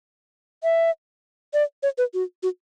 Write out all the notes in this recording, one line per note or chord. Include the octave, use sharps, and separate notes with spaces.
E5
D5
C#5
B4
F#4
F#4